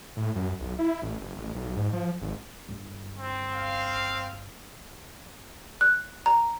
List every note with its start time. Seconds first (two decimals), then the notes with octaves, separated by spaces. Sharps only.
0.17 A2
0.35 F#2
0.60 B1
0.79 E4
1.02 A1
1.20 F#1
1.36 A1
1.55 B1
1.76 G#2
1.93 F3
2.21 G#1
2.69 G1
3.18 C4
3.54 F5
5.81 F#6
6.26 A#5